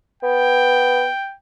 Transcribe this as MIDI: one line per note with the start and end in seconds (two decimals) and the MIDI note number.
0.23 1.06 59
0.23 1.35 79